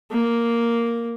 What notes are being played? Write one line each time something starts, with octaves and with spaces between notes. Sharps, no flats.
A#3